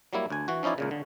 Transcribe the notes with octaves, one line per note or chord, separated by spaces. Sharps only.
F#3 G3 A#3 E4
D2 G#5
E3 F#4
F3 C#4 D#4 E4 D5
C#2 A#2 C#3
D3